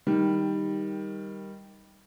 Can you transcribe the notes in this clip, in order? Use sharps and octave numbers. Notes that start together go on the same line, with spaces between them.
D#3 G3